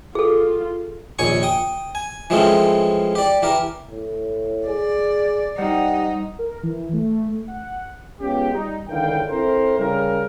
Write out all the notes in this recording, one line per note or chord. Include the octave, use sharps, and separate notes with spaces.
F4 G#4 A4
A#1 D#2 C#5 G#5 C#6
G5 D#6
G#5
E3 F3 G#3 A3 C4 C#4
G4 D5
E3 G4 A#4
A2
G#4 D5
G3 D#4 G4 C5 F#5
A#4
E3
A3
F#5
G#3 B3 C#4 F4 G4
G3 D#4
C#2 D3 D#3 E4 F5 G5
C4 E4 A4 A#4 C5
C#3 G3 A#4